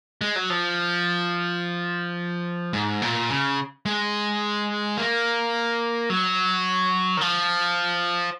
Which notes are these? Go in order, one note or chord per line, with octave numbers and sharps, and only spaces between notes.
G#3
F#3
F3
G#2
A#2
C#3
G#3
A#3
F#3
D#3
F3